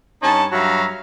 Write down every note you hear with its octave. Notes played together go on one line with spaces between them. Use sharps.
G2 C#4 D#4 A5
G2 F#3 F#4 E5 F5 A#5